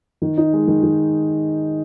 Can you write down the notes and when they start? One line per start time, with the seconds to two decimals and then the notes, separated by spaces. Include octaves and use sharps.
0.22 D#3
0.38 D#4
0.53 G#3
0.68 D#3
0.83 D#3